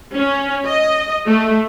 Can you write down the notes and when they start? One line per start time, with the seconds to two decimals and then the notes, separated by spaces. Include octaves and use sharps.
0.17 C#4
0.67 D#5
1.27 A3